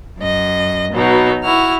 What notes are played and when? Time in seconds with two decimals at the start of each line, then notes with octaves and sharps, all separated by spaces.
0.18 F#2 D#5
0.93 B2 F#3 B3 D#4
1.43 E4 F#4 F6